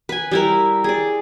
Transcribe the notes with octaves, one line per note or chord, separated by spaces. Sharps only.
B4 G#5
G3 E4 A#4
G#4 D5